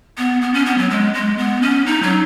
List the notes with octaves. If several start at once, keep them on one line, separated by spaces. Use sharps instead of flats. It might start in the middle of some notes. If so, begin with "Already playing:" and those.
B3
B3
C#4
B3
F#3
G#3
G#3
B3
C#4
D#4
F#3